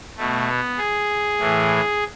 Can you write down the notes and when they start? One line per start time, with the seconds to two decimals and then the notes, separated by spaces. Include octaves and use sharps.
0.17 B2 A3
0.48 B3
0.78 G#4
1.38 A2 E3